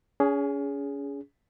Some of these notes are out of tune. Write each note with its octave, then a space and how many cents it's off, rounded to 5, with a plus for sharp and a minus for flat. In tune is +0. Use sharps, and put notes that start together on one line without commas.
C#4 +35 G#4 +0